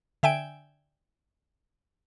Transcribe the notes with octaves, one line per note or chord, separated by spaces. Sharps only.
D3 E5 G5 G#5 D7